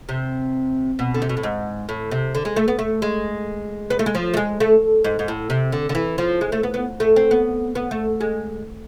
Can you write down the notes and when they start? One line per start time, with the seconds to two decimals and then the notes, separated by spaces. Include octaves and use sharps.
0.09 C3
0.99 B2
1.14 D3
1.22 C3
1.29 B2
1.37 A2
1.43 G#2
1.89 A2
2.11 C3
2.35 D3
2.45 G#3
2.56 A3
2.68 B3
2.79 A3
3.02 G#3
3.90 B3
3.99 A3
4.06 G#3
4.15 F3
4.34 A3
4.37 G#3
4.60 A3
5.04 G#2
5.19 G#2
5.28 A2
5.50 C3
5.72 D3
5.89 D3
5.95 E3
6.18 F3
6.41 G#3
6.52 A3
6.63 B3
6.74 B3
7.00 A3
7.16 C4
7.31 B3
7.75 B3
7.91 A3
8.21 G#3